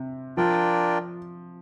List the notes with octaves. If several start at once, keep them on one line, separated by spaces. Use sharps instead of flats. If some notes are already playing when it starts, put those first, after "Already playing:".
Already playing: C3
F3 D4 F4 A#4 D5 G5